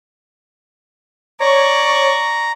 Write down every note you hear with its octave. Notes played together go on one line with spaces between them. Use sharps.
C#5 D5 A#5 C#6